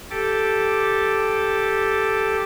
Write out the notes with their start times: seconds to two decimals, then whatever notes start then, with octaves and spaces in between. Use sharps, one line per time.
0.10 G4 A4 D6